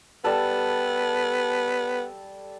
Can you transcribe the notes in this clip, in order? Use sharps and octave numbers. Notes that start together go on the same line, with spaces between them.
G3 B3 A4